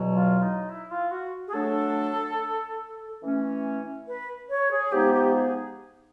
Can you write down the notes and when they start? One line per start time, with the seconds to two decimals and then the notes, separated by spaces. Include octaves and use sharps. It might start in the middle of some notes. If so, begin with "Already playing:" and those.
Already playing: E2 B2 F#3
0.13 F4
0.41 D#4
0.69 E4
0.90 F4
1.11 F#4
1.47 G#4
1.53 F#3 A3 D4 A4
3.22 E3 A3 C#4
4.07 B4
4.49 C#5
4.71 G#4
4.91 F3 G#3 B3 D#4 G4
5.13 G4
5.34 G#4